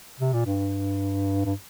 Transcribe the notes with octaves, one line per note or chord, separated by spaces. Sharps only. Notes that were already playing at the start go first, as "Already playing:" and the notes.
C3
A#2
G2
G2